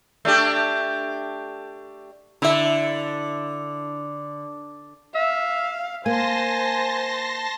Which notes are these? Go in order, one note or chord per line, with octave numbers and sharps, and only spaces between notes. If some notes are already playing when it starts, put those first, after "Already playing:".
A3 D4 G4
D3 E4 E5
E5 F5
A#3 C5 G#5 A5 C6 A#6